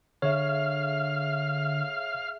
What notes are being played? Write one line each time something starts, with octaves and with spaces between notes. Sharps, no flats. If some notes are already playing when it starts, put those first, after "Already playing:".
D3 G#4 C#5 E5 F5